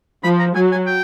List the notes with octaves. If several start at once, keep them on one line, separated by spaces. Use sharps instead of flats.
F3 B5
A#5
F#3 G#5
G#5
G5